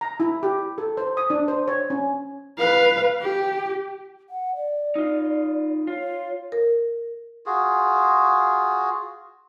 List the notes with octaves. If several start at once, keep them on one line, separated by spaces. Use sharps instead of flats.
A#5
E4
G4
A4
C5
D#6
D4
C5
C#5
C#4
B4 F5
G4
F#5
D5
D#4 F4
F4 C#5
A#4
F4 F#4 G#4